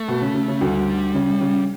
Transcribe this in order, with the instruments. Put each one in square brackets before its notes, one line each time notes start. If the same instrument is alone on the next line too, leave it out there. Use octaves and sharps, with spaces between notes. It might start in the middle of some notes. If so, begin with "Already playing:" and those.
Already playing: [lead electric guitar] A3
[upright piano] B2
C#3
C#3
C#3
[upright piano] D2 D3 [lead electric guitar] G3
[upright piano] C#3
C#3